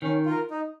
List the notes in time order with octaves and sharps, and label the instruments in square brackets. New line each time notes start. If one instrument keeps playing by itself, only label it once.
[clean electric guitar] D#3 [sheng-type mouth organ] C#4
[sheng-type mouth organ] F4 A#4
D#4